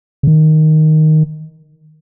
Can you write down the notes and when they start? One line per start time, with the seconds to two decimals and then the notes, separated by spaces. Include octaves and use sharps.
0.23 C#3
0.27 D#3